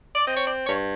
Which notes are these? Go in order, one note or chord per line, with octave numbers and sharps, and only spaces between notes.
D5
C4 D#5
C#5
D5
G2 C#5